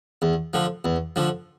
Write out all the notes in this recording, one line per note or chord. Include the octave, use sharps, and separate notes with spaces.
E2
D3 F3
E2
D3 F3